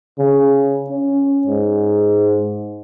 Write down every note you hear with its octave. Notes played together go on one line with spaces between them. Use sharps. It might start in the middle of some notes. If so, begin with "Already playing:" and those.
C#3
C#4
G#2